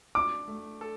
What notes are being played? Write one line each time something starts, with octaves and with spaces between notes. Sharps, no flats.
D4 D6
A3
A4